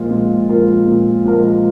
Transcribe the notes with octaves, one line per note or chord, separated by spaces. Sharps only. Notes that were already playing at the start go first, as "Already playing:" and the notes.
Already playing: A#2 F3 G#3 F4 A#4
A#2
F3 G#3 F4 A#4
A#2
F3 G#3 F4 A#4